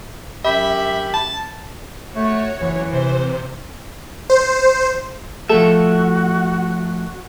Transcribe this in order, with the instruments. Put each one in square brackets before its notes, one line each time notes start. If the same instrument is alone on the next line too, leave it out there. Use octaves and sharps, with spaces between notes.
[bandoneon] F#2 G4 B5 [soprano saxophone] E5
[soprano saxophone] A5
[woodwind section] A3 [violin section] F#4 C#5
[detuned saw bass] F#1 [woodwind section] E3
[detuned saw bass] C3 [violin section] C5
[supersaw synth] C5
[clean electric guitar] F3 A3 E5 [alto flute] F#4 [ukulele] A4